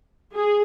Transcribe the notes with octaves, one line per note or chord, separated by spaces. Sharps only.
G#4